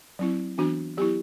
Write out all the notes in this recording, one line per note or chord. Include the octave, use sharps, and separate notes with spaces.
F#3 C4 E4
E3 B3 D4 F#4
F#3 B3 E4 G4